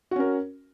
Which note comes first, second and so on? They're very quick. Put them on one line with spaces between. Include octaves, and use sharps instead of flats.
F#4 C#4 A#4